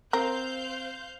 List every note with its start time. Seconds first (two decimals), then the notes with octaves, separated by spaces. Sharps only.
0.13 C4 A#4 C5 F5 G6